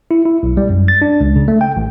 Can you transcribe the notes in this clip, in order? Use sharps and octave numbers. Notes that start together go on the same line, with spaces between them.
E4
E4
B1
G3
F#2
A6
D4
C#2
C#3
A3
G5
A1